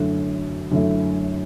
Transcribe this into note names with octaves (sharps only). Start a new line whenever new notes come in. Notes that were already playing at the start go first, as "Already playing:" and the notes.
Already playing: F#2 D3 A3 E4
F#2 D3 A3 E4